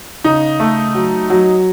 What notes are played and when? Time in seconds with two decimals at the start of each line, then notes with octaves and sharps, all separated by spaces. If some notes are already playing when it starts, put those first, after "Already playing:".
0.24 C#3 D#4
0.60 A3
0.95 F#3
1.30 F#3